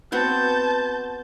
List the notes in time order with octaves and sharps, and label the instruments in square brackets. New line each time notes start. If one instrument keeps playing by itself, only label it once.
[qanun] B3 C4 F#4 [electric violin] A5 G6